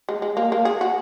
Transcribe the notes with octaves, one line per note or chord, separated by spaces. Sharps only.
G#3
G#3
A#3
A#3
G#4
F#4